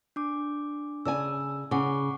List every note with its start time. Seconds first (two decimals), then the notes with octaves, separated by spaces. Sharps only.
0.16 D4 D6
1.05 C#3 D5 G#5 E6
1.71 C#3 F#5 C#6 D6